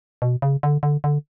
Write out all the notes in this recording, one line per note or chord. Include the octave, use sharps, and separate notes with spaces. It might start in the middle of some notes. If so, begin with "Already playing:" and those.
B2
C#3
D3
D3
D3